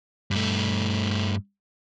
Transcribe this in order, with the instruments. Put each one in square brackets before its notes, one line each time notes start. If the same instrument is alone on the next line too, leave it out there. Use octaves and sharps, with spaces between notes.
[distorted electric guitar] G2 A3